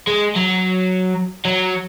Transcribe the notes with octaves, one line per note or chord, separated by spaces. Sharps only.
G#3
F#3
F#3